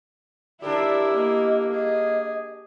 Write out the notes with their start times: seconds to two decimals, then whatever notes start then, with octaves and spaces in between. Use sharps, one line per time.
0.62 D4 E4 G4 A#4 D5 E5
1.15 A#3 D#5
1.72 G#4 D#5